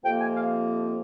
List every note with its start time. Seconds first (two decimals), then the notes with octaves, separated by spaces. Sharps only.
0.05 F2 C3 F3 A#3 G5
0.20 G#5
0.37 F5